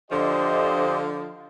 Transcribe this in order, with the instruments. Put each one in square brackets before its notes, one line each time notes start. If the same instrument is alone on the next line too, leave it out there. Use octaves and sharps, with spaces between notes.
[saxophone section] D3 F3 [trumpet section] G4 C5 D#5